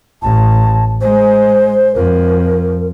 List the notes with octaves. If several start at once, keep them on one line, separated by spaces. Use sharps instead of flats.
A1 A5
G#3 C5
F2 A#4